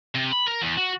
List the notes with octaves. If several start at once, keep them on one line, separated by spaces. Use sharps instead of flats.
C3
B5
A#4
E2
F#4